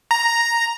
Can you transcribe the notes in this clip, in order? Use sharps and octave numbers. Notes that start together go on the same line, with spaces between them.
A#5